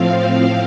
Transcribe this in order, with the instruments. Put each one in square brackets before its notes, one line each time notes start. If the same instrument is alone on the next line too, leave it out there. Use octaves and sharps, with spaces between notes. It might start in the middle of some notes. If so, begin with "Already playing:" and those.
Already playing: [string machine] A2 F3 C4 F5